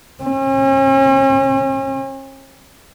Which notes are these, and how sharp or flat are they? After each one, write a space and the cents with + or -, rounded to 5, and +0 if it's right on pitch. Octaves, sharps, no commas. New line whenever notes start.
C#4 -40